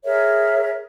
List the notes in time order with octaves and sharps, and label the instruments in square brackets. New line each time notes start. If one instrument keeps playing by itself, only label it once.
[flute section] G#4 A#4 C#5 E5